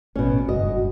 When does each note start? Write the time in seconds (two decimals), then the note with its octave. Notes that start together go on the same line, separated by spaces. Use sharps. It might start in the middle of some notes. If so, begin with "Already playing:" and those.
0.16 A1 B2 C#4
0.49 F#1 G2 F#4 D#5